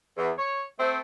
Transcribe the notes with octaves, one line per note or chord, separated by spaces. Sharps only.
E2
C#5
A3 C4